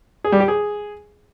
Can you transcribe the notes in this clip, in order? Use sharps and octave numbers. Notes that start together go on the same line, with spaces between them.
G#4
G3
G4
G#4